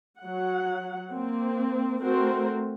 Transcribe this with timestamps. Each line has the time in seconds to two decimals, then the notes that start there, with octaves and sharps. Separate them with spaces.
0.19 F#3 F#5
1.12 A#3 C4
2.02 A3 C4 F#4 A#4 C5